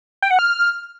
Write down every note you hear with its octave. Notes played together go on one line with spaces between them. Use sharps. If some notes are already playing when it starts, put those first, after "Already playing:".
G5
F#5
F6